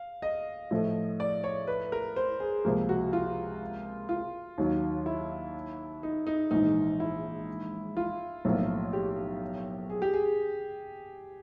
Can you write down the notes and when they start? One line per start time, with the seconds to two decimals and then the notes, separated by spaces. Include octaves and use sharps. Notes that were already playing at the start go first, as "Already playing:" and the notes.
Already playing: F5
0.22 D#5
0.71 A2 F3 A3
1.20 D5
1.44 C#5
1.67 B4
1.92 A#4
2.16 C5
2.40 G#4
2.65 C#2 C3 F3 A#3
2.89 F#4
3.13 F4
4.09 F4
4.58 D#2 D#3 F#3
5.06 E4
6.03 D#4
6.27 D#4
6.51 A#1 G#2 E3 D#4
7.00 E4
7.97 F4
8.45 B1 A2 F3 A#3
8.93 G4
9.90 G#4
10.02 G4
10.13 G#4